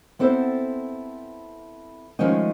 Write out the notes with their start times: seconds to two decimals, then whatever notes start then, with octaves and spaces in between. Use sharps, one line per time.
0.19 B3 C4 E4 A4 C5
2.19 D#3 F3 G#3 A3 C#4 D#4